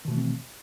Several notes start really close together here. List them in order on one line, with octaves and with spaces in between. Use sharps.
D#3 B2 A3 E3 C4